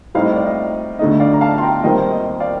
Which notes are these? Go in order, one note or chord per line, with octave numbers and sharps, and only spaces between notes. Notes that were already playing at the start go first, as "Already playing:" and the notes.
A2 G3 C4 D#4 F5
D#5
D5
D#5
D2 D3 A3 D#4 D#5
D5 F5
A#5
F5 A5
C6
G5 A#5
D#2 D#3 G3 C4 D#5 G5
D#5
D5 F5